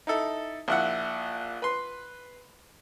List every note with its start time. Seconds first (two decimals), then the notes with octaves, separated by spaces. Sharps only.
0.07 D#4 E4 A4
0.68 A#1 E4 F#5
1.62 B4 C6